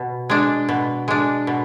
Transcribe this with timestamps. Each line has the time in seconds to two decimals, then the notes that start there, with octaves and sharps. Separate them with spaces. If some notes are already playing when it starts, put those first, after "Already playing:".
Already playing: B2
0.30 G#3 D4
0.69 B2
1.08 G#3 D4
1.47 B2